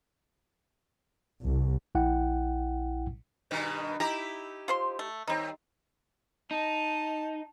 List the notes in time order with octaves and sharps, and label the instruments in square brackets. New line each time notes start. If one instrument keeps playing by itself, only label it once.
[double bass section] C2
[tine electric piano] A#1 E4 F#5 G5
[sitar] G2 B2 D#3
[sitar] D#4 E4 G4 [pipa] A#5
[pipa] F4 C5 C6
A3
[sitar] D#2 C4 [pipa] G3 D#4
[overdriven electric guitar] D#4 [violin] A5